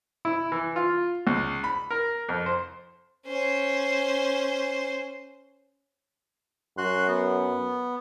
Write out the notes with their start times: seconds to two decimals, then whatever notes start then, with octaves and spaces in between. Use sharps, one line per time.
0.25 E4
0.52 E3
0.76 F4
1.27 C#2
1.64 B5
1.91 A#4
2.29 F2
2.46 C5
3.27 C#4 C5
6.78 F#2 F#4 C6 F#6
7.08 B3